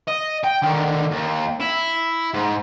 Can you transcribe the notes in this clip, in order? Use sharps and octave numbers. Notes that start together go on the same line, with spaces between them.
D#5
G5
D3 D#3
D#2
E4
G#2